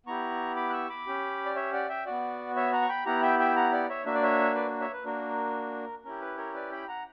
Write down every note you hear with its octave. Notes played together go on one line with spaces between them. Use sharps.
B3 E4 G4 A#5 C#6
B5 D6
F#6
C#6 E6
B5 D6
C#4 G4
D5
C#5 E5
D5 F#5
E5 G5
B3 F#4 D5 F#5
C#5 E5
F#5 A#5
C#6
G5 B5
B3 E4 G4 F#5 A#5
E5 G5
E5 G5
F#5 A#5
D5 F#5
C#5 E5
A#3 D4 F#4 E5
D5
C#5 E5
B4 D5
C#5 E5
B4
A#3 D4 F#4 A#4
C#4 E4 G4 A#4
B4
A#4 C#5
B4 D5
G5 B5
F#5 A#5